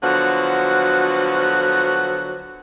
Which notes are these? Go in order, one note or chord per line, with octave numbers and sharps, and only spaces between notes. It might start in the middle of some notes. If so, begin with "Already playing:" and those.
D3 F3 F#3 B3 F#4